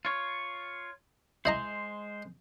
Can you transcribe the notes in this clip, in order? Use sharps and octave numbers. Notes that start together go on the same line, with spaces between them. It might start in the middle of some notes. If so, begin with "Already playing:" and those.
F4 C#5
G#3 E4 C5 D#5 A#5